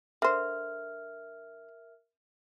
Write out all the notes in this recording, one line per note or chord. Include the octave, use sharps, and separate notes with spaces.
D3 A#4 C5 E5 F6